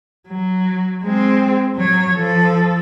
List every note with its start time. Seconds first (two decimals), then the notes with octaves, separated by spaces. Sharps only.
0.28 F#3
1.03 G#3 C4
1.75 F#3 C#5
2.14 F3 A4